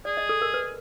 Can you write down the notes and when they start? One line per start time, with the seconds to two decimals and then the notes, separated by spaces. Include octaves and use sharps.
0.05 G#4 D5
0.17 D#5
0.29 A4
0.42 A#4
0.54 B4